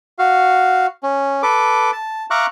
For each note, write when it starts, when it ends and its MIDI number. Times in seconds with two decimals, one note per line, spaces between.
0.19 0.87 66
0.19 0.87 77
1.03 1.42 61
1.43 1.91 69
1.43 1.91 71
1.43 1.91 86
1.92 2.26 81
2.30 2.46 76
2.30 2.46 77
2.30 2.46 82
2.30 2.46 85
2.30 2.46 86
2.30 2.46 90